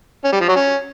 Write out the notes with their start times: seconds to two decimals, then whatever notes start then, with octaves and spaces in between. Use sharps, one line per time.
0.24 C#4
0.32 G3
0.40 F3
0.48 F#3
0.56 C#4